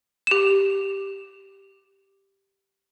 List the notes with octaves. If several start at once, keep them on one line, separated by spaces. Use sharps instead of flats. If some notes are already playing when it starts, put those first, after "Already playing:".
G4 E7